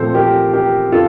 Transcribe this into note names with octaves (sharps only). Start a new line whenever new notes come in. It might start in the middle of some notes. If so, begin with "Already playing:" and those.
Already playing: A#2 F3 A3 C4 A4 C5
G4 A#4
G4 A#4
F4 A4